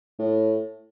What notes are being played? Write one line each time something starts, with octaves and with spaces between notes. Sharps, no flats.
A2